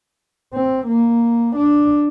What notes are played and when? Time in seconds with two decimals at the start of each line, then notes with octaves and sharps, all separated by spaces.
0.53 C4
0.87 A#3
1.57 D4